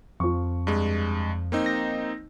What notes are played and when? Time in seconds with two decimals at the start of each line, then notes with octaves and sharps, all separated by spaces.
0.20 F2 F3 C#6
0.67 G2 G#3
1.52 A#3 C4 D#4
1.66 A#6